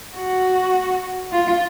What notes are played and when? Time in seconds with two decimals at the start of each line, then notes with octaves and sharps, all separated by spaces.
0.16 F#4
1.32 F4